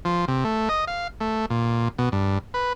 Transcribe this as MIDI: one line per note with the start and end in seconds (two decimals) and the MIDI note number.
0.05 0.25 53
0.28 0.44 48
0.44 0.69 57
0.69 0.85 75
0.88 1.08 77
1.20 1.46 57
1.50 1.88 46
1.98 2.09 47
2.12 2.38 43
2.54 2.73 71